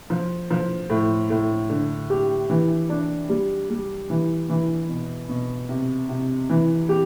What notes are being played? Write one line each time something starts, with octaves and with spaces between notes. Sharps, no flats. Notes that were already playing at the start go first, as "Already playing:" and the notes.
F3
F3
A2
A2
D3
G4
E3
D4
G3
G3
E3
E3
B2
B2
C3
C3
E3
G4